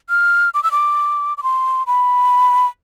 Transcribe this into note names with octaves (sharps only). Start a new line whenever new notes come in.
F6
D6
E6
D6
D6
C6
B5